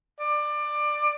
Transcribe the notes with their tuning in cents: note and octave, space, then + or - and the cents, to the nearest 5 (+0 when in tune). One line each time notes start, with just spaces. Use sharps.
D5 +20